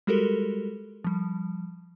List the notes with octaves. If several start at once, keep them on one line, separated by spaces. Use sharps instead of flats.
G3 G#3 F#4 G4 A4 A#4
F3 G3